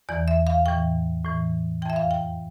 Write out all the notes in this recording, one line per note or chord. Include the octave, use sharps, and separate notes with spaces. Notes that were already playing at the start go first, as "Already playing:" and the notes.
E2 E3 D5
E5
F5
A2 E3 G5
A2 E3
F2 E3 E5 G5
F5
G5